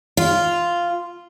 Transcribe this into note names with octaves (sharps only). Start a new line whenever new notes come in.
F4